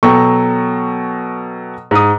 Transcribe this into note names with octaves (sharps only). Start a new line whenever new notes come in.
B2 F#3 A4 G5 C#6
G#2 D#6